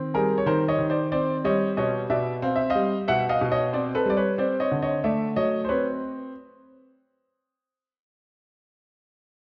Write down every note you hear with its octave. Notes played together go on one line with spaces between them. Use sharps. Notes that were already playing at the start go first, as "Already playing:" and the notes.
Already playing: D#3 C4
G3 G#4 A#4
C#5
D#3 A#4 C5
C#5 D#5
D#3
C5 D5
C4 C5 D5
G3 C#5 D#5
B2 C#5 D#5
B2 D5 E5
C4 F5
E5
D#5 F5
G3
B2 E5 F#5
D#5 F5
B2
C#5 D#5
C4 C5 D5
A4 B4
G3 D5
B4 C#5
C4 C5 D5
C#5 D#5
D3
C#5 D#5
A3 D5 E5
F#3 C#5 D#5
C5
C4 B4 C#5